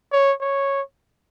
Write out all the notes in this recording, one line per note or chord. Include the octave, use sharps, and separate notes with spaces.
C#5
C#5